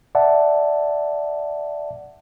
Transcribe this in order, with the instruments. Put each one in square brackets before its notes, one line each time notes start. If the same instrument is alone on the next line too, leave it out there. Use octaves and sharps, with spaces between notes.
[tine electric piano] D5 E5 F#5 A5